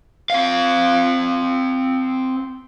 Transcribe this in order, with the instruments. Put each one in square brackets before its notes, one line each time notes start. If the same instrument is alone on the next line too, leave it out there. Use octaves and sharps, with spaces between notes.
[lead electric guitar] C4 F5